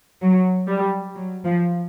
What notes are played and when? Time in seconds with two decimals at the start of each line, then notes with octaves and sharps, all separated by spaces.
0.22 F#3
0.68 G3
1.15 F#3
1.45 F3